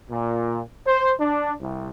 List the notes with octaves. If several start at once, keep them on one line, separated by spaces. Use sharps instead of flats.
A#2
C5
D4
C2